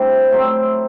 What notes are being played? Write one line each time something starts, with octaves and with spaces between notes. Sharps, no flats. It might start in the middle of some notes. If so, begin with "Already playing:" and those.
Already playing: C3 G3 A3 C4 D4 E4
A2 F#3 C4